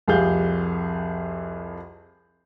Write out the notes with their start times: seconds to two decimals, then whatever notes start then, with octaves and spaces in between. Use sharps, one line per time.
0.08 C2 F2 G4 G#4 F5 G6